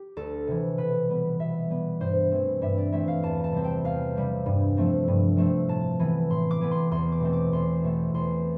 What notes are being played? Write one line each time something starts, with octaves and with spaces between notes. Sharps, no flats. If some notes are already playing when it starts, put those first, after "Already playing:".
Already playing: G4
D2 A4
C3 E3
B2 B4
G3 B3
B2 E5
G3 B3
G2 C5
E3 A3 C4
G2 E5
D5
E3 A3 C4 E5
F5
E2 A5
A5
C3 G3 C4
G5
E2 F5
C3 G3 C4
G2
F3 A3 C4
G2
F3 A3 C4
A2 A5
E3 B3
A2 C6
D6
E3 B3
C6
E2 C6
D6
B2 A3 C4
D6
E2 C6
B2 A3 C4
E2 C6